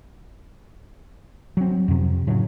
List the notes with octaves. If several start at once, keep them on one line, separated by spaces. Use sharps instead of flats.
F#3 C4
F2 C3
A2 C#3 F#3